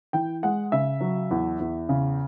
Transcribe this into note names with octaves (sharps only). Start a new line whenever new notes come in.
E3 G5
G#3 F#5
C#3 E5
F#3
E2
E2
C#3